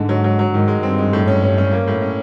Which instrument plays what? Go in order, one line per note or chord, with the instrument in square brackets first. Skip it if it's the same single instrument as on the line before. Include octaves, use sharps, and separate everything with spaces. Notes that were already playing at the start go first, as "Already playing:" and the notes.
Already playing: [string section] G#2 [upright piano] D3
[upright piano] F#3
F#3
F#3
[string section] G#2 [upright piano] D#3
[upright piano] G#3
[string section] G2 [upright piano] C4
[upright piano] G#3
A2
C#4
C#4
C#4
A#3
A2
C#4